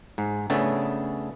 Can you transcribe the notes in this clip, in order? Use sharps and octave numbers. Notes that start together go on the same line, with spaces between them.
G#2
C#3 A3 B3 C#4 D4